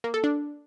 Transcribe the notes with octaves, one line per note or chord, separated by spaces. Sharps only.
A#3
A4
D4